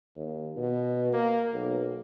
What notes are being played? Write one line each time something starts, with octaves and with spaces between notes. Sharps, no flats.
D#2
B2
A#3
B1